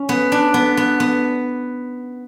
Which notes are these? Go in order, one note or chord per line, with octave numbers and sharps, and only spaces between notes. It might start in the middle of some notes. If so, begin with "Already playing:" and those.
Already playing: C#4
B3
D4
B3
B3
B3